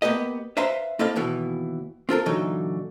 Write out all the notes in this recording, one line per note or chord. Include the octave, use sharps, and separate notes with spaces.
A#3 B3 G4 B4 D#5
B4 C5 E5 F5 A#5 C6
A#3 C4 E4 A4 D#5 F5
D#2 B2 E3
C4 F4 A4 A#4
A#2 D3 E3 F#3 D#4